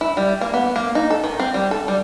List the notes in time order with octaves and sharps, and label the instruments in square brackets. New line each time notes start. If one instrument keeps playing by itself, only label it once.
[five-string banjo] E4
G3
A#3
B3
A#3
D#4
A4
D#3
C4
G3
A4
G3